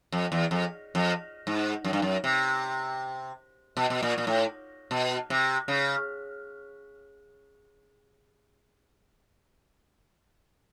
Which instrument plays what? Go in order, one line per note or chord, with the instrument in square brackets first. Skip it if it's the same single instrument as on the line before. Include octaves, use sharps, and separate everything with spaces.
[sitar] F2
E2
F2
F2
G#2
F#2
G2
F#2
C3
B2
B2
A#2
A#2
A2
B2
C3
C#3